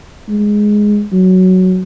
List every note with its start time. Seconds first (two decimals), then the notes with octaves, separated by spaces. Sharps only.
0.29 G#3
1.13 F#3